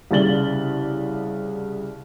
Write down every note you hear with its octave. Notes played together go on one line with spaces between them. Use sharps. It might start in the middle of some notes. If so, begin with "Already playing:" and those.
C2 C#3 D5 A6 F#7 G7